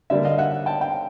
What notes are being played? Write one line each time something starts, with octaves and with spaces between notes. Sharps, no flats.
D3 G3 A#3 D5 E5
D#5 F5
E5 F#5
G5 A5
F5 G5